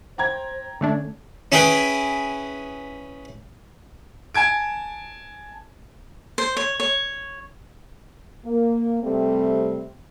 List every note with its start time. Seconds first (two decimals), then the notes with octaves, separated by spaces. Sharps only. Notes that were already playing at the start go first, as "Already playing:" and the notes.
0.18 C5 G5 A#5 G#6
0.81 D3 A3 C#4 D4
1.52 C#4 E4 G#4 B4 G5
4.34 G#5 A5 G#6 D7
6.38 C5
6.57 C#5
6.80 C#5
8.46 A#3
9.04 C3 G3 A3 C4